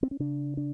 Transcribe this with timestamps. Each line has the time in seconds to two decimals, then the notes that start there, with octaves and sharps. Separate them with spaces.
0.03 C4
0.11 C#4
0.20 C#3 D4
0.57 D4